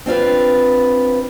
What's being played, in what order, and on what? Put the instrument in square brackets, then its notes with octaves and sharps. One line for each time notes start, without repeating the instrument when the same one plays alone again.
[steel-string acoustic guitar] C4 D4 F4 B4